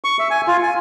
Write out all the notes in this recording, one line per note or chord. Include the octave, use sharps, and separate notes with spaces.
C#6
E5
G#5
F4
G#5